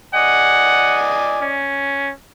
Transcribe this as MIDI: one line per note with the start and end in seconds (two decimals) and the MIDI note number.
0.15 1.55 74
0.15 1.55 75
0.15 1.17 78
0.15 1.55 80
1.42 2.13 61